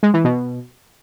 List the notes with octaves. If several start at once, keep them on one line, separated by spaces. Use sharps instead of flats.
G#3
E3
B2